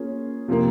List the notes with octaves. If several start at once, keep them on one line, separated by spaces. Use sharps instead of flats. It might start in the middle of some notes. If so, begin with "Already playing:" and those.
Already playing: A#3 C#4 F4 G#4
C3 F3 A#3